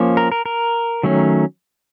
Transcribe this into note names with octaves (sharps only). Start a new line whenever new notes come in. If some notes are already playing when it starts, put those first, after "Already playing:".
Already playing: F3 A#3 C#4
A#4
A#4
A#4
D#3 F#3 A3 C#4